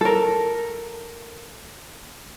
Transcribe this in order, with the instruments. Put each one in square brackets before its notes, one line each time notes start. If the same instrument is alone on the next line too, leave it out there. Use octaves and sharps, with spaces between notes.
[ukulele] A4 A#4